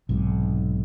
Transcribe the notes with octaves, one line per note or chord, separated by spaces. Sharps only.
B1 G#2 C3